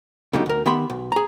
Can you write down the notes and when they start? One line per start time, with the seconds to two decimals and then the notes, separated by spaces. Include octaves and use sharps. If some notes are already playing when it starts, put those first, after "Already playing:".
0.33 C#2 B2 D3 F#3 G3 D#4
0.46 D2 A#4
0.66 D#3 B3 G4 E5 B5 C6
0.90 B1
1.12 G#4 A#5